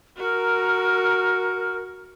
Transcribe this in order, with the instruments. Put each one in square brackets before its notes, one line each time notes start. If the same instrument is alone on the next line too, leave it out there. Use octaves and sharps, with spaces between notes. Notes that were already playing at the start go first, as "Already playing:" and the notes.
[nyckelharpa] F#4 [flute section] A#4